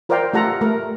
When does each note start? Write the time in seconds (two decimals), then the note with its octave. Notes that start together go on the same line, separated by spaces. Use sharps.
0.09 F4 A#4 C5 D5 F5 G5
0.33 A3 F4 G4 A4 F#5 A#5
0.61 A3 A#4